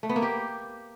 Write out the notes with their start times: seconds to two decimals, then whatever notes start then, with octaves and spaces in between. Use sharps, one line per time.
0.03 A3
0.09 B3
0.16 A#3
0.22 G4